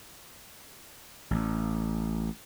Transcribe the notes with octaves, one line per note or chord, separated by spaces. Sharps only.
A1